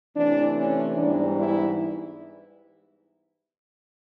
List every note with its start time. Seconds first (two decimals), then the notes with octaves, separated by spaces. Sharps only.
0.16 C3 E3 A3 C#4 D4
0.57 C#4
0.97 G#2 E3 G3 B3 D4
1.38 E4